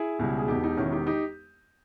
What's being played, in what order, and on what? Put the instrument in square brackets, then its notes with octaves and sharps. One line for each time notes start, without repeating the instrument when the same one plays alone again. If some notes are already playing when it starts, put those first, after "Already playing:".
Already playing: [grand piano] E4 G#4
C#2 B2 G3
G#4
E1 E2 B2 D#4 G4
D#4 G4
E1 E2 D#3 C#4 E4
D#4 G4
D#4 G4